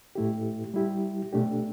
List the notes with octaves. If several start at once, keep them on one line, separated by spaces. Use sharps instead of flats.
A2 A3 E4 G4
G3 E4 G4
B2 A3 D4 G4